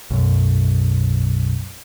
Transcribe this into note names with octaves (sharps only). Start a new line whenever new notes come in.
B1 F#2